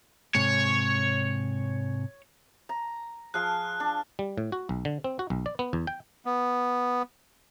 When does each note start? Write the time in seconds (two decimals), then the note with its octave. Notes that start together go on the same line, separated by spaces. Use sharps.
0.35 G#2 C3 C#5
2.69 A#5
3.34 F3 G#4 F5 F6 F#6
3.80 D4
4.19 G3
4.38 A2
4.52 F#4
4.69 B1
4.85 D3
5.04 C4
5.19 F#4
5.30 B1
5.46 D5
5.59 B3
5.73 E2
5.87 G5
6.26 B3